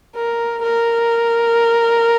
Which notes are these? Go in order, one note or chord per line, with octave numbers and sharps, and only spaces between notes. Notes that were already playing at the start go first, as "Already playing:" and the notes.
A#4
A#4